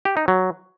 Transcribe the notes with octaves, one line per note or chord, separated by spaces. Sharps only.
G4
D#4
F#3